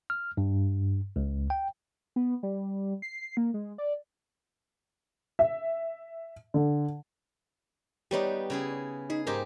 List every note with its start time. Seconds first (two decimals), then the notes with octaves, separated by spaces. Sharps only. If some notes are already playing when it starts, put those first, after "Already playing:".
0.10 F6
0.37 G2
1.16 C#2
1.50 G5
2.16 B3
2.43 G3
3.02 C7
3.37 A#3
3.54 G#3
3.78 D5
5.39 E5
6.54 D3
8.11 G3 B3 D#4 G4 C#5 D5
8.50 C#3 E4 G#4
9.10 D#4 G#4
9.27 G#2 D#4 G4 A#4 C5